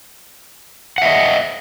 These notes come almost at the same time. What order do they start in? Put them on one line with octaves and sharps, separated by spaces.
F#5 E5 D#5